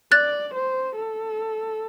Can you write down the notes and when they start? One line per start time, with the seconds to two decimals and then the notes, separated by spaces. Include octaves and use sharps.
0.12 D5 F#6 A6
0.54 C5
0.96 A4